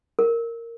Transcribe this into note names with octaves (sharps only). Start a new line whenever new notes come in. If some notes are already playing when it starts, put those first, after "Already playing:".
A#4